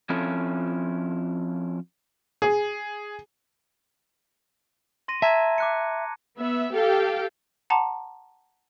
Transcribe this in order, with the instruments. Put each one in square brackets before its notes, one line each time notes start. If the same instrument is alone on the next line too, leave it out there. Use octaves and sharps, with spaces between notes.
[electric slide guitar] F3 C4 C#4 E4 F4 A4
[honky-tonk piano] G#4
[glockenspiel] C6 A#6 D#7
[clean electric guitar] E5 [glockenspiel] A5 A#5 G#6
[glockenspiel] D6 F#6 C#7
[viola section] B3 E5
G4 A4 F5 G5
[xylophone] F#5 A5 A#5 C6 D6